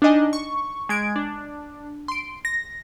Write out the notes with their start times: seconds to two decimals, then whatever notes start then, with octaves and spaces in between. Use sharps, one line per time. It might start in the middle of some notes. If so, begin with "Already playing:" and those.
0.02 D4 D#4 D#5 G#5
0.33 C#6
0.89 G#3 G#6 D7
1.16 D4
2.08 C6 D7
2.45 A#6